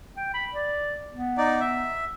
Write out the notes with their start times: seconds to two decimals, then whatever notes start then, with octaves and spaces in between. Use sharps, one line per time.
0.17 G5
0.34 B5
0.53 D5
1.12 B3
1.38 D#4 D5
1.60 E5